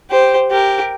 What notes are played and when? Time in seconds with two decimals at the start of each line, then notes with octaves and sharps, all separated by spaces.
0.10 G4 C5
0.51 G4 A#4